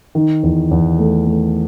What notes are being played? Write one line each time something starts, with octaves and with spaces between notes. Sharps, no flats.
D#3
E2
E2
A3
A3